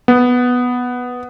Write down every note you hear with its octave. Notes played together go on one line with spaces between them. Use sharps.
B3